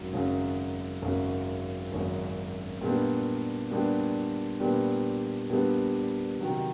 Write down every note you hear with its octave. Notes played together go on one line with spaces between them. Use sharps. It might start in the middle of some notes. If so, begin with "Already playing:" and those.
Already playing: G#1 F#2 C#3 F#3
G#1 F#2 C#3 F#3
G#1 F#2 C#3 F#3
G#1 F#2 C#3 F#3
A#2 G3 B3 D4 G4
A#2 G3 B3 D4 G4
A#2 G3 B3 D4 G4
A#2 G3 B3 D4 G4
C3 D#3 F#3